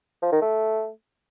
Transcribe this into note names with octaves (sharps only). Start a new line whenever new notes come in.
F3
D#3
A3